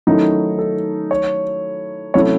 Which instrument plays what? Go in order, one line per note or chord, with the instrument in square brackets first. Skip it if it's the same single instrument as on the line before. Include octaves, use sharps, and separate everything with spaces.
[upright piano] D#3 F#3 A3 C#4 E4 [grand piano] D#4
[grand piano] A4
C#5
[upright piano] C3 F#3 A3 C#4 E4 [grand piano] C#5